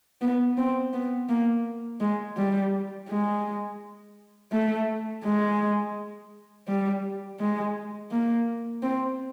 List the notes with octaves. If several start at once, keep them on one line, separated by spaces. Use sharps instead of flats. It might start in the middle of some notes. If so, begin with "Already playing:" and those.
B3
C4
B3
A#3
G#3
G3
G#3
A3
G#3
G3
G#3
A#3
C4